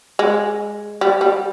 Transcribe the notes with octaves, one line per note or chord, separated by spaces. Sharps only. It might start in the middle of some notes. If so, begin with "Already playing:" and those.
G#3
G3
G3